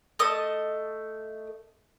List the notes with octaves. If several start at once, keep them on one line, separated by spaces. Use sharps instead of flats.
A3 D#5 A5 D#6